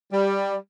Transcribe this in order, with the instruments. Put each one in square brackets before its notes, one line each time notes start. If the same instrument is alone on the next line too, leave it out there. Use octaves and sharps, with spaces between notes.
[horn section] G3